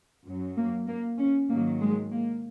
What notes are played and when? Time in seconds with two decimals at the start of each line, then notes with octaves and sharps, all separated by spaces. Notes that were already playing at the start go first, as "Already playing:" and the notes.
0.24 F#2 F#3
0.57 A#3
0.87 A#3
1.18 C#4
1.49 G#2 D#3 F#3 A#3
1.81 G#3
2.12 A#3